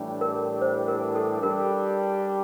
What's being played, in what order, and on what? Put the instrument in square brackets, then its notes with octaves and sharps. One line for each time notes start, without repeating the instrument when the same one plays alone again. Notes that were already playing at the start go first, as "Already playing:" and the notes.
Already playing: [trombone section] A2 E3 G3 D4 G4
[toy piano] A#4
C5
A#4
A4
[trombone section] G3 D4 G4 [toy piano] A#4